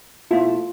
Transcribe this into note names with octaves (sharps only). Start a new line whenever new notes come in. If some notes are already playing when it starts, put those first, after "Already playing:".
B2 A3 E4 F4